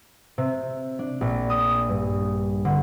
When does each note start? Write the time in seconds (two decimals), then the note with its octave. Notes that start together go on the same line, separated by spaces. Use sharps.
0.38 C3
0.99 D4
1.21 A#1
1.50 D#6
1.89 G2
2.65 D3